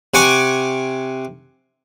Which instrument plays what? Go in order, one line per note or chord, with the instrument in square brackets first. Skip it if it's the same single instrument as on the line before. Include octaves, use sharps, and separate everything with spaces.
[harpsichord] C3 F#5 G#5 C#6 D6